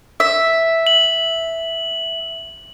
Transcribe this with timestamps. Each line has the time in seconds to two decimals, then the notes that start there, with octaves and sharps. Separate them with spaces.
0.20 E5
0.87 F#7